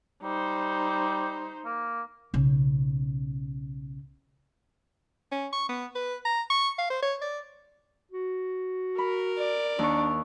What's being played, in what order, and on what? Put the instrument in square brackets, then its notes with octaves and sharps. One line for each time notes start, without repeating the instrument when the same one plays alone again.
[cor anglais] G3 [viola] D#4 C5
[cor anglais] A#3
[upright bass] B1 C#3
[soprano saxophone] C#4
C#6
B3
B4
A#5
C#6
F5
C5
C#5
D5
[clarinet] F#4
[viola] A#4 [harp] B5
[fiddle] D5
[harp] D#2 C#6 [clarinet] D4